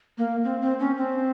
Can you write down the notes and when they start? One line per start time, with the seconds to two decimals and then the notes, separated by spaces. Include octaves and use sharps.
0.18 A#3
0.44 C4
0.61 C4
0.79 C#4
0.97 C4